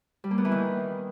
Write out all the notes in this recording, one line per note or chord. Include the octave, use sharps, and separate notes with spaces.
G3
A#3
B3
E3
D#3